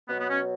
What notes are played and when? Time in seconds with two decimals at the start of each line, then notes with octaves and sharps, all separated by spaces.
0.09 B2 F#3 B3
0.20 B3
0.30 C#4